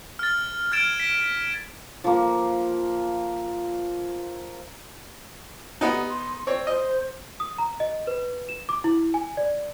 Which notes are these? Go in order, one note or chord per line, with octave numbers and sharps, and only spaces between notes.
F6 A6
F6 G#6 A6 D7 E7
B6
F3 A#3
B3 D#4 G4
C6
C4 C#5 D5
C5 D#5
D#6
A#5
D#5
B4
E7
D6
E4
G#5
D5